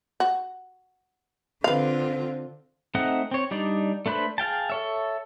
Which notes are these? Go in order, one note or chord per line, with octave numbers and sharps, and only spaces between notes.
F#4
D3 C4 F4 B4 F5
A3 C4 D#4 D#5 F#5
C4 C#5
G3 D4 D#4 D5
A3 D4 B4 C5 B5
G#4 F5 G5 A5
A4 C#5 E5